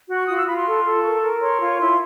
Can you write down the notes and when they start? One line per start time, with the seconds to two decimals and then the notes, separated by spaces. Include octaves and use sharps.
0.09 F#4
0.15 C#6
0.27 F4 D#6
0.37 E6
0.46 F4 B5
0.56 C6
0.65 A4
0.85 A4
1.04 A#4 C#6
1.22 A#4
1.41 C#5 C6
1.60 F4
1.79 E4 C6